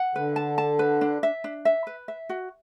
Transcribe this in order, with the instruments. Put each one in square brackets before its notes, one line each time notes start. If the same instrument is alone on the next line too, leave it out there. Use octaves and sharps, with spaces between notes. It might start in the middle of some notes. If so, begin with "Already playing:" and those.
Already playing: [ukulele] F#5
[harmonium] D3 [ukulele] B4
[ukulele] A5
A5
B4
D4
E5
D4
E5
B4
E5
F#4